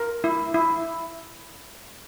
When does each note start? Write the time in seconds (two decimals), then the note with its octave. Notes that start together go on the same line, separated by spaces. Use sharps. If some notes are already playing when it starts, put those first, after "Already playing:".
Already playing: A#4
0.24 E4
0.54 E4